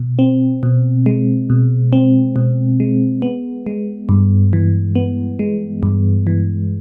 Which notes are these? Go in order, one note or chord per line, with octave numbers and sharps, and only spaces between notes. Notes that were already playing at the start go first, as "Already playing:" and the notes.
Already playing: B2
C4
B2
G#3
B2
C4
B2
G#3
B3
G#3
G2
E3
B3
G#3
G2
E3